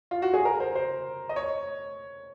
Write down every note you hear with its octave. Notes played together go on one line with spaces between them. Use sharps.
F4
F#4
G#4
A#4
C5
C5
D#5
C#5